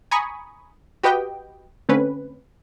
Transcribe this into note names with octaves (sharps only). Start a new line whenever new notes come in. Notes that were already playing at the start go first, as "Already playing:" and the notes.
G#5 A#5 B5 C#6 D#6
F#4 G4 B4 D#5 G5
D3 A3 C4 C#4 B4